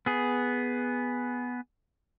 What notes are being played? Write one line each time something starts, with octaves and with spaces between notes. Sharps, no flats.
B3 G#4